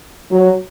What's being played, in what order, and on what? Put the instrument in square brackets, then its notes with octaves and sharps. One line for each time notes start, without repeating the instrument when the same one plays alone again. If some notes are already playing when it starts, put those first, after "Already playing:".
[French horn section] F#3